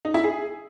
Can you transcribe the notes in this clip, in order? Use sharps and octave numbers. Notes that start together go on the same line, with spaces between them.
D#4
E4
G#4